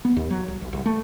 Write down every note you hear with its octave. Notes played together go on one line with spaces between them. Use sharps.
B3
D#2
F#3
C2
B1
C2
A3